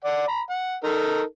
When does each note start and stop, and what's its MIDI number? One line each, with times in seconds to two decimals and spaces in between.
0.05 0.26 74
0.05 0.26 78
0.28 0.41 82
0.28 0.41 83
0.50 0.75 78
0.84 1.22 63
0.84 1.22 69
0.84 1.22 70